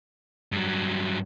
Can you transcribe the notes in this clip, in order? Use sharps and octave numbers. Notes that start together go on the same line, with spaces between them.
G2 F#3